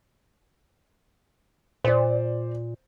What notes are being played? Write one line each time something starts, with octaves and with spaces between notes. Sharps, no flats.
A#2 C5 D5